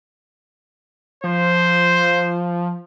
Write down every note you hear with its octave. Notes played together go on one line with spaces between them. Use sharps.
F3 C5